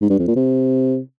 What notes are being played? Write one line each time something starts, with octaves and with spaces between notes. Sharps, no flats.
G#2
G2
F2
A#2
C3